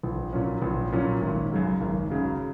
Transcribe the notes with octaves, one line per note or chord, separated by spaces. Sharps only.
A#1
A#2 F#3 C#4
A#1
A#2 F#3 C#4
G#1
F#2 C#3 F#3
G#1
F#2 C#3 F#3